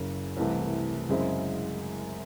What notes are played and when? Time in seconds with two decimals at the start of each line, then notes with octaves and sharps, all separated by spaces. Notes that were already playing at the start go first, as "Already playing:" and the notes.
Already playing: F#1 F#2 C#3
0.37 C2 C3 E3 A3
1.09 F#2 C#3 G#3 C4 E4